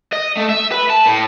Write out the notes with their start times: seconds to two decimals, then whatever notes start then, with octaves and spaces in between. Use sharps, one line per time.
0.13 D#5
0.37 A3
0.49 E5
0.72 B4
0.90 A5
1.07 A2